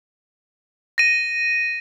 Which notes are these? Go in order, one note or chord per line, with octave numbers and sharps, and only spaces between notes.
A#6 D#7